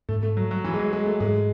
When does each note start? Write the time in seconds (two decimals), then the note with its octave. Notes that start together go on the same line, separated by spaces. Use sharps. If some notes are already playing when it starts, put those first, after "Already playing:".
0.09 G#2 A3
0.23 A3
0.37 F#3
0.51 F#3
0.64 E3
0.74 G#3
0.79 F#3
0.93 G#3
1.06 A3
1.20 G#2 G#3